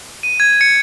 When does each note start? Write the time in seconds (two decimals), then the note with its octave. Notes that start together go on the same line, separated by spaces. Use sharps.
0.23 D#7
0.40 G#6
0.61 C#7